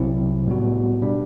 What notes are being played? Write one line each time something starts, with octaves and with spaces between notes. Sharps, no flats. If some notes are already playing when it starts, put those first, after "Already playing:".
Already playing: C2 C3 F#3 C4 E4
A2 G3 B3 F#4
B2 G3 D4